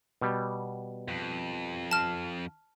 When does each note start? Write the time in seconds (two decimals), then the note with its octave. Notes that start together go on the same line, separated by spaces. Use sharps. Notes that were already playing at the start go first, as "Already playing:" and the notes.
0.21 B2 G3
1.08 F2
1.91 A5 F6